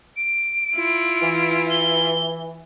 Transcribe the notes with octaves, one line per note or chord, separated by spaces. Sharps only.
D7
E4 F4
E3
G7